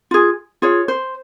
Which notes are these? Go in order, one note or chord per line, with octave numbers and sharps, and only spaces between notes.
F4 G#4
F4 G#4 C#5
C5